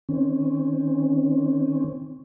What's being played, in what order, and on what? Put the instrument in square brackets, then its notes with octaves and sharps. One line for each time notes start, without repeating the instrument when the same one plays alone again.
[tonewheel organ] D#3 C4 C#4